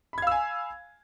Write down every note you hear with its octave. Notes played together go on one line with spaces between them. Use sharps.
F5 G#5 B5 E6 G#6